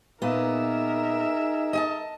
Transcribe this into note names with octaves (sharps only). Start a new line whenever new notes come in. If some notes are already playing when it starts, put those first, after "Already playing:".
A#2 B3 D#4 G#4 A#4 E5
D#5 G#5 A5